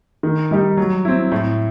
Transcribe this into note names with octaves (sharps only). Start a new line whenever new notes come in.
D#3
G3 D#4 G4
F#3
C4 E4
A2